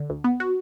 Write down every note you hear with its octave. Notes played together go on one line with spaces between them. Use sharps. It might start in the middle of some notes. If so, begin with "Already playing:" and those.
Already playing: D3
D2
B3
F#4